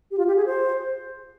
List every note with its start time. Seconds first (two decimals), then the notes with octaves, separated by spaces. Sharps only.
0.11 G4
0.18 F4
0.27 G4
0.37 G#4
0.46 C5